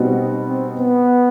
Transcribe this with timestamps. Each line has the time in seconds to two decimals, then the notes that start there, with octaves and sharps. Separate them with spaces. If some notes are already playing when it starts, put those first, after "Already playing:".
Already playing: B2 G3 B3 C4 D#4 F#4
0.48 C4
0.78 B3